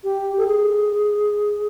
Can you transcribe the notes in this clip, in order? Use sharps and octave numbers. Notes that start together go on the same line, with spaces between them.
G4
A4
G#4